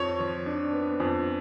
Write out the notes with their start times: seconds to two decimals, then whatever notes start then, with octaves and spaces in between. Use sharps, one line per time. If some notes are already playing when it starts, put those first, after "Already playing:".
Already playing: F2 C#5
0.20 F3
0.46 D4
0.73 B3
1.00 F2